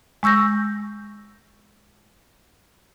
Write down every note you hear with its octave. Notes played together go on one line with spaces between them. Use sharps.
G#3 C#6 E6 G6 A#6